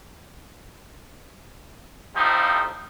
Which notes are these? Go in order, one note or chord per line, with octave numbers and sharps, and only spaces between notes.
F2 A2 F3 G3 D#4